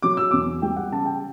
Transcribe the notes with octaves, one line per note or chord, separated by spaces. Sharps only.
F#3 D6
E6
E2 D6
G3 G5
F#5
C#3 A5
G5